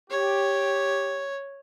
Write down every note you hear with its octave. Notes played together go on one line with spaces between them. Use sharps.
G4 C#5